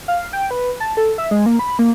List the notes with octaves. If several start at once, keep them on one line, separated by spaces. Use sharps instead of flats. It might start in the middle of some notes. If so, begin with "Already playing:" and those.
F5
G5
B4
A5
A4
E5
G#3
A#3
B5
A#3